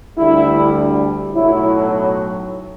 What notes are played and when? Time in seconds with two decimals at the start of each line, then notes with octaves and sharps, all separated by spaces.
0.17 D2 D3 G3 E4
1.35 B1 A2 F#3 E4